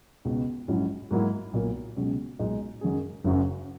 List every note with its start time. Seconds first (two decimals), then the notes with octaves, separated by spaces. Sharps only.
0.25 C#2 B2 G#3 B3 D#4
0.68 A#1 G#2 F#3 C#4 E4
1.11 G#2 F#3 A#3 E4
1.53 B1 A#2 A#3
1.96 C#2 B2 F#3 C#4 G#4
2.39 B1 A#2 G#3 D#4
2.81 F#2 D#3 F#3 C#4 G#4
3.24 F#1 F#2 C#3 F#3